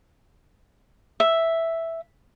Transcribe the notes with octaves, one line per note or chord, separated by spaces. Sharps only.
E5